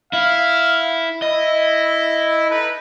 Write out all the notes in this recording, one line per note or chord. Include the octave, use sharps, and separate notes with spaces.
E4 F5
E4 D#5
D#4 A4 B4